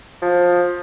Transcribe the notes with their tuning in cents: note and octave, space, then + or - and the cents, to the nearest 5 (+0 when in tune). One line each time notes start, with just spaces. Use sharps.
F3 +20